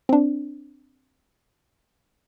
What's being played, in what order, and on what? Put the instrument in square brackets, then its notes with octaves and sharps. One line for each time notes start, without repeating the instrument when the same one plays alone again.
[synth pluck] C4 D4